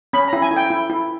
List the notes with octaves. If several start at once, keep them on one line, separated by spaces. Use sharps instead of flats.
C#4 B5
A#5
E4
G#5
E4
G5
E4
E4